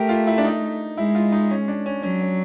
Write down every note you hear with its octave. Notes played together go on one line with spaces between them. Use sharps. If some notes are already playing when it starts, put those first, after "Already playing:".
Already playing: A3 G4 A#4
F4
E4
D4
D#4
G#3 E4
F4
D#4
C#4
D4
C#4
F#3 C#4
C#4